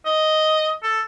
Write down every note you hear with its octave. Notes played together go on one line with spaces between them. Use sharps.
D#5
A4